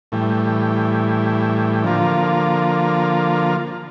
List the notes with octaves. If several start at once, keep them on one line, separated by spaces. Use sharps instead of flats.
A2 E3 G3
D3 F3 A#3 F4